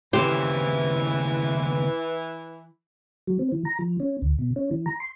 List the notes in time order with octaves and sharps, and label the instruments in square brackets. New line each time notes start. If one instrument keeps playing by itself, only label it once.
[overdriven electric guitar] D#2 C#3 [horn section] E3 [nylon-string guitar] G4 C5
[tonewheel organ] F#3
C4
E3
A#5
F3
C#4
D2
B2
C#4
E3
A#5
C6